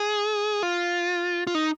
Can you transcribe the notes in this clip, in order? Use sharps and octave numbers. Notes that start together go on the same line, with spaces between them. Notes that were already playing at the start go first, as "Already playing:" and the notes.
Already playing: G#4
F4
F4
D#4